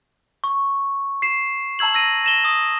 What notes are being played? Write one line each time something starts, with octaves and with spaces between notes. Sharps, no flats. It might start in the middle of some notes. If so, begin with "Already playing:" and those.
C#6
C7 E7
A5 A#5 E6 G#6 F#7
E6 A#6 D#7
A#6 E7 G7
D#6